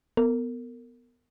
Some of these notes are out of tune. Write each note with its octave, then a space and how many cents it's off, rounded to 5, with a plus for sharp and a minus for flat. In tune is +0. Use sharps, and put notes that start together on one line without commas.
B3 +0 A#4 -35